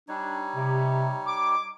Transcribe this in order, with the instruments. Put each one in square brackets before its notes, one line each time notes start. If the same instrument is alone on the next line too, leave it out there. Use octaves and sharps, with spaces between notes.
[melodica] G3 D#4 C#5 [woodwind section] D4
[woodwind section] C3
D6